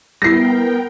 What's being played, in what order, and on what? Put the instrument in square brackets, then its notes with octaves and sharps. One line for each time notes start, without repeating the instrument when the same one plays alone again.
[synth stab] G3 E4 [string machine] B3 A#4 G5 [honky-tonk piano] A#6 C7